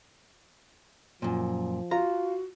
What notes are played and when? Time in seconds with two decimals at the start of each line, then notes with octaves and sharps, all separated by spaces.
1.22 F#2 A#2 F3
1.91 F4 F#4 A#5